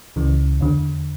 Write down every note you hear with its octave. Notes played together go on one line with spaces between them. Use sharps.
C#2 C#3 E3
E2 D3